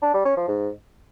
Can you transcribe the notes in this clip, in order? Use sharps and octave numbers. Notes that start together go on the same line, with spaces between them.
D4
G3
C#4
F3
G#2